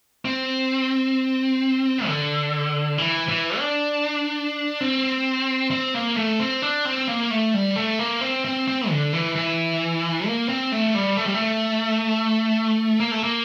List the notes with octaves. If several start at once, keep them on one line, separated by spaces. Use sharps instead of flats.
C4
D3
E3
E3
D4
C4
C4
A#3
A3
C4
D4
C4
A#3
A3
G3
A3
A#3
C4
C4
C4
D3
E3
E3
A#3
C4
A3
G3
A3
G3
A3
A#3
A3
A#3